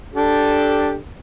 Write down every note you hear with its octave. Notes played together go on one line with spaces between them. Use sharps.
D4 G4 A4